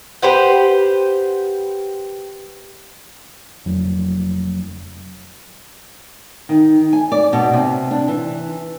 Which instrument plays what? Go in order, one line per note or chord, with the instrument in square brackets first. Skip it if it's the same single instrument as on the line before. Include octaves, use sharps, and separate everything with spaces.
[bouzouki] G4 B4 C5 F#5
[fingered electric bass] F1 F2 F#3
[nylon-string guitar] D#3
G#5
D5
B2
C3
D4
E3